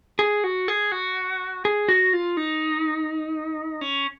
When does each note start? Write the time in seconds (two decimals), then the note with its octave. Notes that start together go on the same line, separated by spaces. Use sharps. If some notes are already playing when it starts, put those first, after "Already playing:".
0.19 G#4
0.44 F#4
0.68 G#4
0.92 F#4
1.65 G#4
1.89 F#4
2.13 F4
2.37 D#4
3.81 C#4